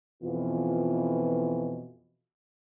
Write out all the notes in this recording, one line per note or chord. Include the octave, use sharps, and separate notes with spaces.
F2 B2 E3 F4